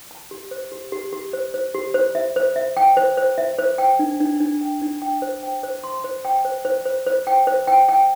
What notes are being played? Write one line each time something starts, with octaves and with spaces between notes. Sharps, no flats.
A5
G4
C5
G4
G4
G4
C5
C5
G4
C5
E5
C5
E5
G5
C5
C5
E5
C5
G5
D4
D4
D4
G5
D4
G5
C5
G5
C5
C6
C5
G5
C5
C5
C5
C5
G5
C5
G5
G5